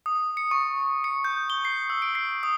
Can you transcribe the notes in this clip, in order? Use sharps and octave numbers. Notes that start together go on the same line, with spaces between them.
D#6
C#7
C#6
C#7
G6
G7
C7
E6
D7
C7
D#6